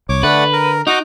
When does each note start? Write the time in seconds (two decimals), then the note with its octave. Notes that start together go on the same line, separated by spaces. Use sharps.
0.09 C2 C#5 D6
0.23 D3 A3 B4 D5 F#5
0.53 A#4
0.87 D#4 F#4 D#5 D6